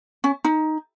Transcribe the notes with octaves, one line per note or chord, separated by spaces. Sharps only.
C#4
D#4